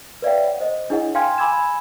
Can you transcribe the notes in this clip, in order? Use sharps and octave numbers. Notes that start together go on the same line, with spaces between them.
B4 C#5 D5 E5 F5 G5
F#5
C5 D#5
D4 E4 G#4 C#5 D#5 F#5
F5 G5 G#5 C6 F6 G#6
G#5 B5 D6 E6 G#6 E7